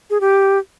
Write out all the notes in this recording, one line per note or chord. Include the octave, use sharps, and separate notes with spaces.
G#4
G4